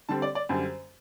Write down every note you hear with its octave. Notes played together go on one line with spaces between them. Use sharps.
D3 G3 C4 A5
D5
D5
F#2 D3 G3 C5